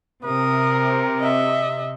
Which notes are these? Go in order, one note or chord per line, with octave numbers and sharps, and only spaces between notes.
C3 A#4 D#6
D#5 E5